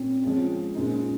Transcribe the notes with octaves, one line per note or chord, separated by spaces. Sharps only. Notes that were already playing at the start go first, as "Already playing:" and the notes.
Already playing: A#2 C4 C#4
F3 G#3 C#4 F4
A#2 G#3 C4 C#4 D#4